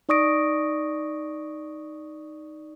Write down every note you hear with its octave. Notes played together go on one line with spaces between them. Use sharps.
D#4 D5 C#6 D#6 A#6 D7